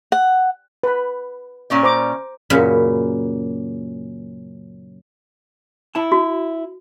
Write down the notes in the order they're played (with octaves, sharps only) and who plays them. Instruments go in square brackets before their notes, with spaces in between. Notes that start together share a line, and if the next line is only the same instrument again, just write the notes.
[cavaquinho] F#5
[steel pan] B4 B5
[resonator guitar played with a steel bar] A#2 C#4 D5
[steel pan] C5 A#5 D6
[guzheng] F#2 A#2 C#3 B5
[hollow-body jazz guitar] E4 A5
[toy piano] F#4